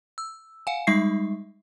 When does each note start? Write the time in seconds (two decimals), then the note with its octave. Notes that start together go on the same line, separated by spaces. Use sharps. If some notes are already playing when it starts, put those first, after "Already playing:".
0.18 E6
0.67 F5 F#5 G#5
0.87 G3 G#3 D#4 E5 C#6 C7